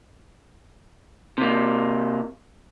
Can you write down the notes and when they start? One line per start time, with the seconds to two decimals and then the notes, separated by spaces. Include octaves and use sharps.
1.38 C3 A#3